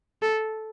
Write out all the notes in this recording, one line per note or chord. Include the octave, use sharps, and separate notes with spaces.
A4